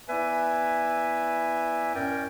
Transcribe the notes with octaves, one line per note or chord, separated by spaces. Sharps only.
B3 E4 B4 D5 E5 G#5
F#2 A2 C#4 A#4 D5 G5